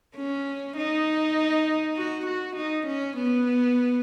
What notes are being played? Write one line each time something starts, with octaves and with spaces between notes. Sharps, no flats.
C#4
D#4
F#4
F#4
D#4
C#4
B3